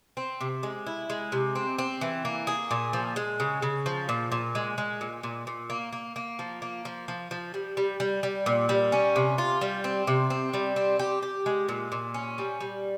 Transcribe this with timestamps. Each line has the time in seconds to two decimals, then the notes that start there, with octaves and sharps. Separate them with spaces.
0.17 C4
0.41 C3
0.63 G#3
0.86 E4
1.10 G#3
1.32 C3
1.55 C4
1.78 C4
2.01 E3
2.25 A#3
2.47 G#4
2.71 A#2
2.93 F3
3.16 G#3
3.40 C#3
3.62 C#3
3.86 F3
4.09 A#2
4.32 A#2
4.55 G#3
4.78 G#3
5.01 A#2
5.23 A#2
5.47 A#2
5.70 A#3
5.93 A#3
6.16 A#3
6.39 F3
6.62 A#3
6.85 F3
7.08 F3
7.31 F3
7.54 G3
7.77 G3
8.00 G3
8.23 G3
8.46 A#2
8.69 G3
8.92 C#4
9.16 C3
9.38 F4
9.61 G3
9.84 C4
10.07 C3
10.30 C4
10.54 G3
10.76 C4
10.99 G4
11.22 G4
11.46 G#3
11.69 A#2
11.92 A#2
12.14 C#4
12.38 G3
12.60 G3